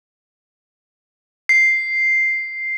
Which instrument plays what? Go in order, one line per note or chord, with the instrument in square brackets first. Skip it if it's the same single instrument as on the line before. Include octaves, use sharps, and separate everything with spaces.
[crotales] C7